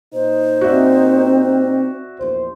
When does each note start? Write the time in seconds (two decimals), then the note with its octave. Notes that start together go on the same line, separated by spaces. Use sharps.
0.13 A#2 D#4 C5
0.61 C4 F#4 D5 E5
2.19 A#1 E2 C5